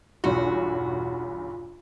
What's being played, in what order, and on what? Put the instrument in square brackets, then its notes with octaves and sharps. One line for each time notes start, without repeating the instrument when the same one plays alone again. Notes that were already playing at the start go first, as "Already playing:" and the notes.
[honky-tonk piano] B1 E2 G2 [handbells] F4 [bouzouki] F#4